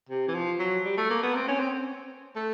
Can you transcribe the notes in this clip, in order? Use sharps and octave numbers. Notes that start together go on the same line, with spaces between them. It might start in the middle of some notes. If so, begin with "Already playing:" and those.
C3
E3
F3
F#3
G3
A3
A#3
B3
C4
C#4
C4
A3